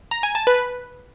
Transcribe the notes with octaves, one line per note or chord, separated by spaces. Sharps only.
A#5
G#5
A5
B4